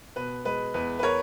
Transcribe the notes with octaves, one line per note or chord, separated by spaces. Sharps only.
B2 B4
G#3 B4
E2 B4
B4
A#4 C#5